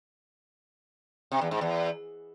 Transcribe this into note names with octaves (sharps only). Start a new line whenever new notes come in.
C3
E2
G#2
E2